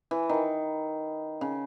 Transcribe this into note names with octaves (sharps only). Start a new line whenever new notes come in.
E3
D#3
C#3